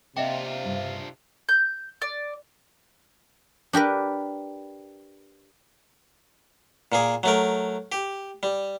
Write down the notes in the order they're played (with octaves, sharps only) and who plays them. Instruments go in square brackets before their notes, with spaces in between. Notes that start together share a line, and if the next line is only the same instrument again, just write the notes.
[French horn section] C3 [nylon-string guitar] C4 [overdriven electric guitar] D4 F4 [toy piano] D#5 E5 G5
[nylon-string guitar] G2 C#3
[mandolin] G6
D5
[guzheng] D4 G4 A#4 B4
[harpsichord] A#2 A#3 G#4
F#3 A3 A#4
G4
G3